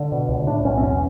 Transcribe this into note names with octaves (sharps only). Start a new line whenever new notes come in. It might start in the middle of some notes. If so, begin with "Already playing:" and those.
Already playing: D3
B2
C#2
A2 D4
B1 C#4
C4
E2 C#4